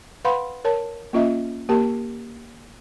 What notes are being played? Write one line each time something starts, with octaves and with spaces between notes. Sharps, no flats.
B4 F5 F#5 B5 C6
A#4 C#5 A5
A#3 C#4 F4 D#5 E5
A#3 G4 A#4 G5 A5